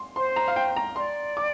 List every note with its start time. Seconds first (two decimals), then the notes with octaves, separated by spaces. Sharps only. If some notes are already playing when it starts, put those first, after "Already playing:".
Already playing: C6
0.16 C5 C6
0.36 A#5
0.48 F5
0.56 G5
0.77 A#5
0.96 D5 C6
1.37 D6